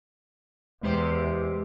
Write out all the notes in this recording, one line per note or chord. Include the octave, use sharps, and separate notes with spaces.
E2 C3 G#3 G4 C5